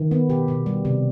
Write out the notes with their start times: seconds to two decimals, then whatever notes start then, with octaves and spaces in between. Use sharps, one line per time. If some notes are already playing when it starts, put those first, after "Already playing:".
Already playing: D#3
0.11 B3
0.29 B2 G4
0.48 B2
0.66 G3
0.85 C3